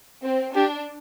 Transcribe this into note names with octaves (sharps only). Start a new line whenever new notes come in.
C4
D4 G4